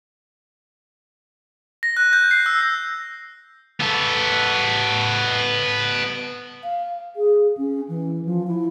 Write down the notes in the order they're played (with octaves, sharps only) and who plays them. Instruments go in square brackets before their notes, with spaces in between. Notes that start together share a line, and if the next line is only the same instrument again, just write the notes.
[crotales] A#6
F#6
G6
C7
E6
[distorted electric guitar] B3 A4
[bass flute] F5
G#4
C#4
E3
F3
E4